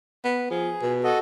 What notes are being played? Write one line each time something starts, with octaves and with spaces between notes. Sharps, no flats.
B3
F3 G#4
B2
F#4 A4 D#5